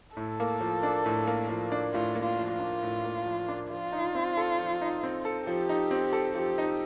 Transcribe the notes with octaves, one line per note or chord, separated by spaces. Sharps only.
A2 A4
A#3
F3
D4
A2
A#3
F3
D4
A2 F4
A#3
F4
F3
F4
D4
A2
A#3
F3
D4
F3 F4
D#4
C4
A4
F3
D#4
C4
A4
F3 G4
D#4
C4
A4
F3 G4
D#4